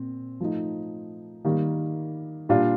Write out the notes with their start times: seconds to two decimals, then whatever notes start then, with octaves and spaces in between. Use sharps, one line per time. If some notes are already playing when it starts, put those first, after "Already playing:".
Already playing: A#2 C4
0.40 F3 A3 D#4
1.45 D#3 G3 A#3
2.49 A#2 G3 D4 F4